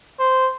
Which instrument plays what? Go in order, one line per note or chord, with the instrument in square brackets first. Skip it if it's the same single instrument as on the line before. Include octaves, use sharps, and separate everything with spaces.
[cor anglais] C5